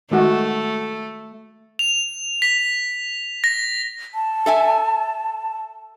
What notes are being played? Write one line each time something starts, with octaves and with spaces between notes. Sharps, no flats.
D#3 G#3 A3 F#4
F7
B6
A#6
A5
A4 E5 G#5